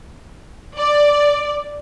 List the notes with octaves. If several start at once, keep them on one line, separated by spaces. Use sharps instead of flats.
D5